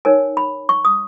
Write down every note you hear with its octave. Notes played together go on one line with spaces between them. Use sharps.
D#4 A#4 C#5 G#5
B5
C#6
D#6